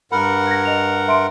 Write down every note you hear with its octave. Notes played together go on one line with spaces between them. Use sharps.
G2 A#4 F#5 B5
G#6 A#6
D#5 F7
E5 C6 D7